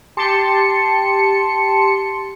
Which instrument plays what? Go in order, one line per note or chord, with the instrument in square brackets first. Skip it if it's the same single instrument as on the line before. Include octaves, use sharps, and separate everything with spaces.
[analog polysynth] G4 A5 C6 C#7